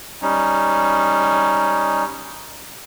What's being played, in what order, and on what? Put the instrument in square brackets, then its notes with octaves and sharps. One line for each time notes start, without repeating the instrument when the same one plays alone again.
[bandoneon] G3 C#4 D#4